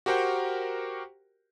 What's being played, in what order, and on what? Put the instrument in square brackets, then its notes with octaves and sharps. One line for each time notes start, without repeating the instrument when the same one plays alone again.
[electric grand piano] F#4 G4 A#4 C5 F#5 G5